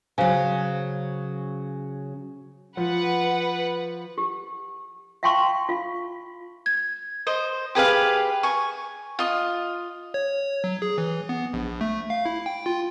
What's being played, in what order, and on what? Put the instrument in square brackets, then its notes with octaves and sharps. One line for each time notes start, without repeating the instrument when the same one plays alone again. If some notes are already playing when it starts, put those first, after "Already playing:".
[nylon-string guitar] C#3 F#3 [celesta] C5 F5 G#5
[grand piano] F3 [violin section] B4 F#5
[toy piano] G4
E5 F5 G5 A5 C6 C#6
F4 F5
[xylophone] G#6
[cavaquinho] C5 D#5
G4 G#4 B4 F5
G#5 C#6
F4 D#5
[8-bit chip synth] C#5
F#3
G#4
E3
B3
A#1
A3
F5
E4
G5
F4